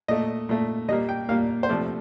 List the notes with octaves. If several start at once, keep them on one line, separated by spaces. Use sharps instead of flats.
A#2 A3 D#5
A#2 A3
A#2 G3 A#3 D#5
G5
A#2 G3 A#3 F5
C5
C3 F3 A3 D5